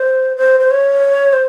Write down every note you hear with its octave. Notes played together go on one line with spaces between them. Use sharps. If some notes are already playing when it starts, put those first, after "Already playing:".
Already playing: C5
C5
C5
C#5
C5